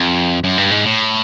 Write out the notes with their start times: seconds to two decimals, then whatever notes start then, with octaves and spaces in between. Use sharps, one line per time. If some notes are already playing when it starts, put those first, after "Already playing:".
Already playing: F2
0.44 F#2
0.58 G2
0.71 G#2
0.85 A2